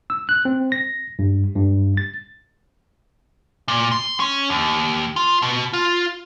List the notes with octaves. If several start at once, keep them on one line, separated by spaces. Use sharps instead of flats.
E6
F#6
C4
A#6
G2
G2
A6
A#2
C6
C#4
D#2
F4
B2
F4